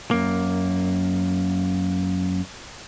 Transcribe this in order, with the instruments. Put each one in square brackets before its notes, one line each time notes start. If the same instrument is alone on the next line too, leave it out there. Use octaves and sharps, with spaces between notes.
[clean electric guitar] F#2 A#3